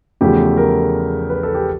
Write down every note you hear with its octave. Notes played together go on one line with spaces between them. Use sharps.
E2 C#3 F3 A3 G4
A#4
B4
A4
G4